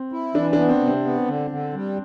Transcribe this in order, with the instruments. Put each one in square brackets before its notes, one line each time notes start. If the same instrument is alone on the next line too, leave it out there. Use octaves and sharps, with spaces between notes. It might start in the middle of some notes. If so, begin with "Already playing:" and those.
Already playing: [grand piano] C4
[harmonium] E4
[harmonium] E3 [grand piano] D4
[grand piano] D4
[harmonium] B3
[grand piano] C4
[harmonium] C3
[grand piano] C4
[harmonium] B3
D3
D3
G3